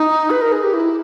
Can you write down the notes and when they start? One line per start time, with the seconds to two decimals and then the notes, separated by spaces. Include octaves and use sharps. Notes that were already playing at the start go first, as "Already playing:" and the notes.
Already playing: D#4
0.30 B4
0.41 A#4
0.52 G#4
0.63 G4
0.73 E4